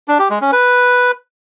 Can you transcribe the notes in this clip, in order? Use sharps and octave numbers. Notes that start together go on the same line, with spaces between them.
D4
G4
G#3
C#4
B4